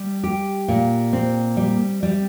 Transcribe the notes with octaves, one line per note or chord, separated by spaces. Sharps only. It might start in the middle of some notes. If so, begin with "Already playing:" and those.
Already playing: G3
G4
A#2
C4
G3
G3